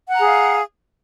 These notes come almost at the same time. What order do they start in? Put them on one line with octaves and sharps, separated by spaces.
F#5 A#5 G#4 F5